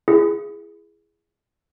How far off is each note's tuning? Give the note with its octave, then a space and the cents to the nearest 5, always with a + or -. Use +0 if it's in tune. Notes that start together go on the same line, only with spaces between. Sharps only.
E4 +30 G#4 +0